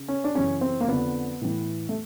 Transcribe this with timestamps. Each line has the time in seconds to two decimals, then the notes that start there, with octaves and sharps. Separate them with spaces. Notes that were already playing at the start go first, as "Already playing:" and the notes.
Already playing: C#3
0.08 C#4
0.24 D4
0.35 F#2 C#3 E3 C#4
0.61 C4
0.81 A#3
0.87 F2 D3 B3
1.41 A2 E3
1.89 A3